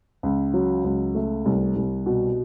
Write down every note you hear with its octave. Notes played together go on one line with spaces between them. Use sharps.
C#2
F#3
C#2
A3
C2
C2
B2